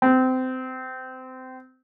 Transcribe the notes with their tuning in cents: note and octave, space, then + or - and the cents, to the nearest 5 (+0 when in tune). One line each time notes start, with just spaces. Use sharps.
C4 -25